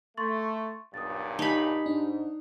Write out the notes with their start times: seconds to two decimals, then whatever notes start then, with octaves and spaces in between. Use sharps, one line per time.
0.17 A3 C6 C#6 A6
0.94 B1 G2 A#2 D#6 A6
1.39 D#4 G4 G#5 A5 B5
1.86 G#2 D4